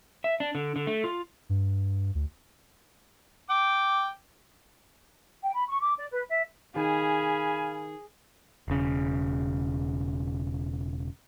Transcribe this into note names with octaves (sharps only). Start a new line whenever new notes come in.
E5
D4
D3
D3
A3
F4
G2
D2
G5 D6
G5
B5
C#6
D6
D5
B4
E5
D#3 G#4 F5 G#5 B5
E1 C#3